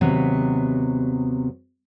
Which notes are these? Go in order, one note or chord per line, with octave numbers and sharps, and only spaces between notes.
D#2 C3 F#3 B3